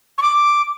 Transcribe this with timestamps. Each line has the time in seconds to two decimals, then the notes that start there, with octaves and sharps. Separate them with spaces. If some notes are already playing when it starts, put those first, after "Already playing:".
0.18 C#6
0.22 D6